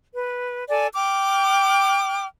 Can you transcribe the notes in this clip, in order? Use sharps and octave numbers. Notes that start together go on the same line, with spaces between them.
B4
A4 D5 G#5
G5 D6 F6